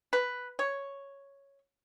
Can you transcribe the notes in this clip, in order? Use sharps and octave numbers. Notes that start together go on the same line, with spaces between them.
B4
C#5